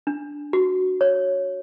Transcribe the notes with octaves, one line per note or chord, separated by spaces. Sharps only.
D4
F#4
C#5